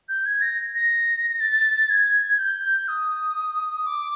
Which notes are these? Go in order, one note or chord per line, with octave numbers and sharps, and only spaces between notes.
G6
G#6
A#6
A#6
A6
G#6
G6
D#6
D6